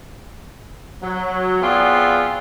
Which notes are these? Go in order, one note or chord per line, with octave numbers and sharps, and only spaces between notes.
F#3
B3 C4 F4 G#4 D5